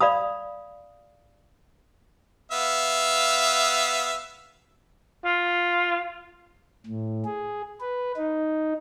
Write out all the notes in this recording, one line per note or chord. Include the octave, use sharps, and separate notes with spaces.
D5 F5 B5 D#6
B3 E5 F5
F4
A2
G#4
B4
D#4